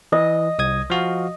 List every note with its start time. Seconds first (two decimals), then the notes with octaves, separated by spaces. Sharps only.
0.12 E3 D#5
0.59 C2 D#6 G#6
0.90 F3 F#4 F5